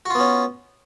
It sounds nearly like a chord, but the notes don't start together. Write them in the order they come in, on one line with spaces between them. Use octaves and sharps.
F#4 F4 B3 C#4